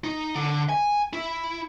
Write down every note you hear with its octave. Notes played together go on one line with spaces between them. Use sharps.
D#4
D3
G#5
E4